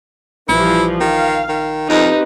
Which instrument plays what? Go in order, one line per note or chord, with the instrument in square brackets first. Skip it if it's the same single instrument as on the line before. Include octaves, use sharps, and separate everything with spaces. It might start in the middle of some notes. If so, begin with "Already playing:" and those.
[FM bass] A#1 [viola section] E3 F3 G3 [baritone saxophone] E4
[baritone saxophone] D#3 [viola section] F5
[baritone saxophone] D#3
[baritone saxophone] F2 [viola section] C4 G4 B4 [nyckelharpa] D#4